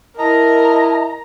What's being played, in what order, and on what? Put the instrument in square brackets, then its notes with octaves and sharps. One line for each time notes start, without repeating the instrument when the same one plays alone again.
[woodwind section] E4 D#5 [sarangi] A#4 [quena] A5 [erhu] A#5